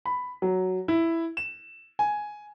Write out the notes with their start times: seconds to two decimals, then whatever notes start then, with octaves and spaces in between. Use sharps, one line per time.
0.05 B5
0.42 F#3
0.88 E4
1.37 E7
1.99 G#5